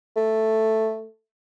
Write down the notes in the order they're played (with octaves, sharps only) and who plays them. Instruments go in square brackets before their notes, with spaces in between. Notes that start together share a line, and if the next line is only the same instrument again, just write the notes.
[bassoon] A3